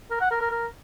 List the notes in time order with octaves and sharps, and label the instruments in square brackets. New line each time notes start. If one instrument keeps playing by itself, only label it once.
[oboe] A#4
F#5
A#4
A#4
A#4